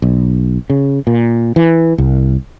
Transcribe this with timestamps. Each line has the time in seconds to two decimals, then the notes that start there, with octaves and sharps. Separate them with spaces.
0.02 B1
0.70 C#3
1.07 A#2
1.56 E3
1.98 C2